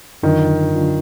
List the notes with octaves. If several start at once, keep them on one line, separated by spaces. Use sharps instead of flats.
F#2 D3 D#3 F#3 D4 F4
D3 F#3 D4 F4